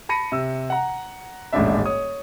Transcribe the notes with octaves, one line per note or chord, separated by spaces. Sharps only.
A5 B5 A#6 C#7 D#7
C3 E6
F#5 A#5
D#1 A1 G#2 C#4 D4 E5
C#5 D#6